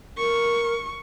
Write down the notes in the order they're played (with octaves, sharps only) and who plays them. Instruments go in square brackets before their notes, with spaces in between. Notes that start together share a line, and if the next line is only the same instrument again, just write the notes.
[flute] A#4 [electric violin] C#6